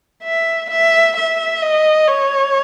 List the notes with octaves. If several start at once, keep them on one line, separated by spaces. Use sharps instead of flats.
E5
E5
E5
D#5
C#5